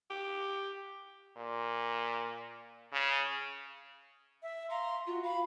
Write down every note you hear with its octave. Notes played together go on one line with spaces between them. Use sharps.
G4
A#2
C#3
E5
F5 A#5 C6
F4 F#4
F5 B5